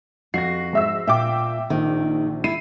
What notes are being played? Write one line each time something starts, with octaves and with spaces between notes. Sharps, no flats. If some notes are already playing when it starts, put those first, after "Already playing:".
F2 F#4 A#6 C7
G#2 E5 E6
A#2 E5 G5 D6
A#1 D#3
E4 C7 D#7